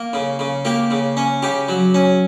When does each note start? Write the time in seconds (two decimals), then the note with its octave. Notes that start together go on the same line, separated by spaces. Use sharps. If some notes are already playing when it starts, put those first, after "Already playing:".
Already playing: A#3
0.13 C#3
0.39 C#3
0.65 A#3 G4
0.91 C#3
1.17 C#4
1.42 C#3 G4
1.69 F#3
1.94 C#4